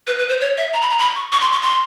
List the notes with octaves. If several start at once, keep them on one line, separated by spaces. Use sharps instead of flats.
B4
B4
C5
C#5
E5
A#5
B5
A#5
B5
C#6
C#6
C6
C#6
C6